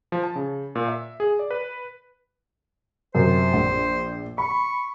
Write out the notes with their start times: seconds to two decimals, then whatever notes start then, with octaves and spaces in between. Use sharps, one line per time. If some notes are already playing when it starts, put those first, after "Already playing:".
0.12 F3
0.24 A5
0.36 C#3
0.75 A#2
0.88 E5
1.20 G#4
1.39 D5
1.51 B4
3.15 F#2 C3 C5
3.53 A#1
4.38 B5 C#6